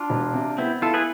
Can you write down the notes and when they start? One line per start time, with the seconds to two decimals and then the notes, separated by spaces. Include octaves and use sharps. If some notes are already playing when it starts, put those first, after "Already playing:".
Already playing: D4 F4
0.10 E1
0.34 C3
0.58 B3 C4 E4
0.82 E4 F4 A4
0.94 G#4 B4